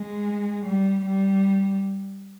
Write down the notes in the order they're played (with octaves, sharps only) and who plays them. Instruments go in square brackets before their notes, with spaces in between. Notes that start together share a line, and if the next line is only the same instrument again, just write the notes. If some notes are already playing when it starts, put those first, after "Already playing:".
Already playing: [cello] G#3
G3
G3